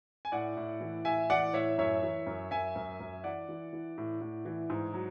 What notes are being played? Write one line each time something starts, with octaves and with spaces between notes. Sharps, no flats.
G#5
A2 D5 F#5
A2
E3
A2 E5 G#5
E3 D5 F#5
A2 C#5 E5
F#2 C#5 E5
E3
F#2
F#2 E5 G#5
F#2
F#2
E3 D5 F#5
E3
E3
A2
A2
E3
G#2
F#3